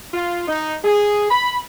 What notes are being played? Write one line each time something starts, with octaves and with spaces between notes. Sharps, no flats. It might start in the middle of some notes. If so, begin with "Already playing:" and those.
F4
D#4
G#4
B5